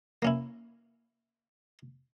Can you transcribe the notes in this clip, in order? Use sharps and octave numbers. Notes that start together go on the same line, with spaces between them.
A#3 C#4 E4